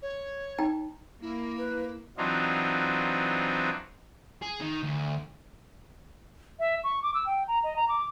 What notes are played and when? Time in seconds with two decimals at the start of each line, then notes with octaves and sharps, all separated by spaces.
0.02 C#5
0.58 D#4 G5 A#5
1.22 A#3 E4
1.58 B4
2.17 E3 F#3 C4 D4 D#4 F4
4.42 G#4
4.60 D#3
4.83 D2
6.59 E5
6.84 C#6
7.03 D6
7.14 E6
7.26 G5
7.48 A#5
7.64 D#5
7.76 A#5
7.89 D6